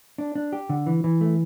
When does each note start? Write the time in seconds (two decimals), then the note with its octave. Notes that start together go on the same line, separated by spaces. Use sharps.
0.18 D4
0.35 D4
0.53 G4
0.69 D3
0.87 E3
1.04 E3
1.21 A3